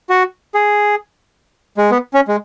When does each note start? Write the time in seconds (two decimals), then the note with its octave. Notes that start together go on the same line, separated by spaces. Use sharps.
0.10 F#4
0.54 G#4
1.77 G#3
1.91 B3
2.14 C#4
2.28 G#3